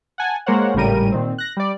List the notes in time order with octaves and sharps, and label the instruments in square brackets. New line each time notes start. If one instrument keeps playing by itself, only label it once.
[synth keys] F#5 G#5 A5
G#3 A#3 A#4 C5 C#5 F#5
G#1 A2 C#3 G3 A#4 D#7
A#2 D#3 C4
F#6 A#6
G3 D5